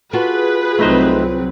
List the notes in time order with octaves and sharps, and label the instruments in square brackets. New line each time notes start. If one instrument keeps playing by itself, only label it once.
[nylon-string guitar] F4 F#4 A4 [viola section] G#4 B4
[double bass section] C2 F#3 C4 [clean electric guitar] A3 D#4 C5